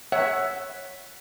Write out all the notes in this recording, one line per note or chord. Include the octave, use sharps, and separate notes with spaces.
C#5 E5 F#5